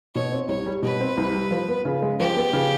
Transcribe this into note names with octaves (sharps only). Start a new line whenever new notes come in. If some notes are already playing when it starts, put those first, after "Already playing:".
B2 C#5
C4
C2 C#5
G3
B2 B4
C4
C2
G3
F3
B3
C#3
G#3
F3 G4
B3
C#3